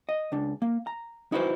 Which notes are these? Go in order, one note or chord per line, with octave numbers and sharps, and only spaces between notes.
D#5
C#2 D4
A#3
A#5
D#4 E4 F#4 B4 C5